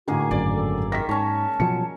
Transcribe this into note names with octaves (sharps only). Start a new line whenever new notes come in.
A2 D3 D#3 A#3 F#4 G#4
G#1 F#2 D5
A4
D#3 A#4 A#6 B6
G#2 C#4 C#5 A5
B2 F3 F#3 C#7